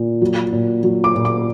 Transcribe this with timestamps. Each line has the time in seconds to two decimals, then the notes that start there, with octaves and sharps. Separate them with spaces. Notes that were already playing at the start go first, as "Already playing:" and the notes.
Already playing: A#2
0.22 F#3
0.53 A#2
0.83 F#3
1.04 D6
1.15 A#2
1.25 D6